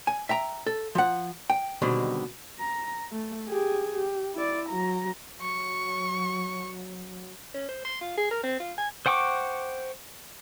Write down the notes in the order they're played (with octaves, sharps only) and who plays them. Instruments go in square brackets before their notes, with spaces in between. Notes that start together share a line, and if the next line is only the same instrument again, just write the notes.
[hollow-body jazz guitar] G#5
E5 G5 A#5
A4
F3 F#5
G5
B2 D3 D#3 G3 G#3 C4
[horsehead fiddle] A#5
A3
G4 G#4
G4
E4 D5
F#3 A#5
[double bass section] F#3 [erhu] C#6
[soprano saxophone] C#4
C5
C6
F4
G#4
A#4
C4
F4
G#5
[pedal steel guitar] C5 F#5 G5 C#6 D6